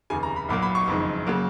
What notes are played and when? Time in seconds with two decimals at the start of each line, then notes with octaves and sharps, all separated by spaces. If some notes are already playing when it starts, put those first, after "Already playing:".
0.10 F1 D#2 C#3 G#5
0.23 A#5
0.36 B5
0.49 B1 A#2 F#3 A#3 B5
0.62 B5
0.75 C#6
0.88 F#1 F2 D#3 G#3
1.26 C#3 F#3 A#3